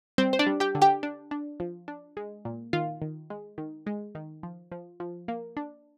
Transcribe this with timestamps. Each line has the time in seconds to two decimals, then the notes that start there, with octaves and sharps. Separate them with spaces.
0.18 G3 C4 C5
0.33 C5
0.39 D4 D5
0.46 G3
0.60 G4 G5
0.75 D3
0.82 G4 G5
1.03 D4
1.31 D4
1.60 F3
1.88 D4
2.17 G#3
2.45 A#2
2.73 D#3 F4 F5
3.02 D#3
3.30 G#3
3.58 D#3
3.87 G#3
4.15 D#3
4.43 F3
4.72 F3
5.00 F3
5.28 A#3
5.57 D4